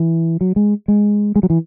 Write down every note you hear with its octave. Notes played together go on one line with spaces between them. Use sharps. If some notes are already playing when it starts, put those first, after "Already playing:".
Already playing: E3
F#3
G#3
G#3
G#3
F#3
E3